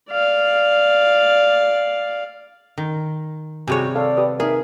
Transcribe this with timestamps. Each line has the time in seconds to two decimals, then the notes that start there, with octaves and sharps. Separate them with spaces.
0.10 D5 F5
2.78 D#3
3.68 C3 G3 F#4 G#4 C#5 G#5
3.95 A4 D5 F5
4.17 G4 B4 D#6
4.40 D#4 G#4 A#4 E5